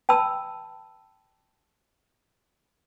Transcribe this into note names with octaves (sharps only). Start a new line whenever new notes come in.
G5 A5 B5 E6